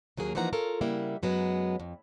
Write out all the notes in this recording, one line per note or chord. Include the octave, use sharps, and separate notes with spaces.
D#2 F#3 A#3 G#4 A#4
E3 F3 A#3 D#4 F#5 A#5
F4 A4 A#4 C#5
C#3 G3 A#3 E4 E5 F#5
F#2 F#3 G#3 B3
F2